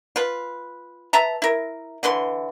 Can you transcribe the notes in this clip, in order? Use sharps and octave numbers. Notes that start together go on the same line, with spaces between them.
F4 B4
B4 E5 A5 A#5
E4 A#4
D3 E3 B4 C6